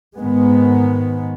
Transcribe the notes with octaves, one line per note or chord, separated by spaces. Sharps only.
G#2 D#3 G#3 B3